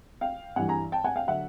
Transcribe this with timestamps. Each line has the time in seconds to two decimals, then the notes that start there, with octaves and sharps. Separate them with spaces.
0.21 F5 G5
0.56 G2 E3 G3 F#5 G#5
0.69 G#5 A#5
0.92 G5 A5
1.04 F#5 G#5
1.16 F5 G5
1.27 D3 F#3 E5 F#5